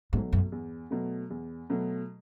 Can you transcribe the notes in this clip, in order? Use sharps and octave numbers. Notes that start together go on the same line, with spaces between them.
G#2 B2 F#3 A3
F#2
E2
B2 F#3 A3
E2
B2 F#3 A3